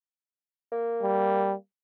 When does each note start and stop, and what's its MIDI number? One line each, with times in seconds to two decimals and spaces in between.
0.72 1.53 58
1.02 1.54 55